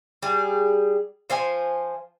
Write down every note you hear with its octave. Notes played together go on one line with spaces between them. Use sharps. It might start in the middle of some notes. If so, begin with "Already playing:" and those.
G3 G#4
F3 C5 G#5